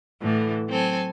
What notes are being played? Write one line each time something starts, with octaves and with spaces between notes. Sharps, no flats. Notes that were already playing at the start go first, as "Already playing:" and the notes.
A2 D3 E3
F#3 C4 A4 G#5